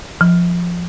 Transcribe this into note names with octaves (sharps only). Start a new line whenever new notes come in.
F3